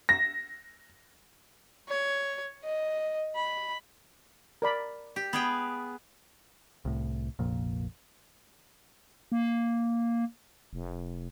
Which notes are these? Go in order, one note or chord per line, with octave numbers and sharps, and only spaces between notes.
A#6
C#5
D#5
B5
A#4 D5 B5
G4
B3 G#4 G5
C2 A2
F1 A#1 F2 A#2
A#3
F1